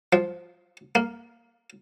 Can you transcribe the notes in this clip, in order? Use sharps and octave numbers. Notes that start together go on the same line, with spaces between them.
F3
A#3